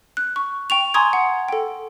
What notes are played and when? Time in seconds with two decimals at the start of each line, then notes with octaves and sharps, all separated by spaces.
0.17 F#6
0.36 C#6
0.70 G5 C#6 F7
0.94 G#5 A#5 C6 C#6 D#6 G#6
1.13 F#5
1.48 A4 G5